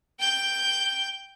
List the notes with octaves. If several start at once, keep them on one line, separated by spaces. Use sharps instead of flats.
G5 G6